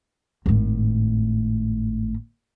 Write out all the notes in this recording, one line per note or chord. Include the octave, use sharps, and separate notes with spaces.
G#1 A2